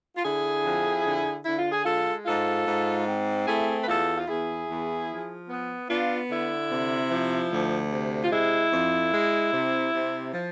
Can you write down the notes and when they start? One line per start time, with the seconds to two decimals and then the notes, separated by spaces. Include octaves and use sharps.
0.16 F4
0.24 D3 E4 G#4
0.64 F2
1.05 D3
1.45 D3 E4
1.58 F4
1.72 G#4
1.85 G#3 F4 A4
2.26 G#2 F4 A4
2.67 G#2
3.07 C4
3.47 A3 E4 G#4
3.83 B4
3.87 E2 F4 A4
4.18 F4
4.28 E2 E4 G#4
4.68 E2
5.09 F3
5.49 B3
5.89 B3 D4 F4
6.29 D3 E4
6.70 C3
7.11 F3
7.51 D2
7.91 C3
8.24 F4
8.31 G#3 E4
8.72 F2
9.13 G#3
9.53 C3
9.93 C3
10.33 F3